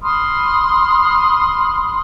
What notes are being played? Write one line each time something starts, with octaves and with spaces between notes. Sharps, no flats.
B5 C6 D#6 F6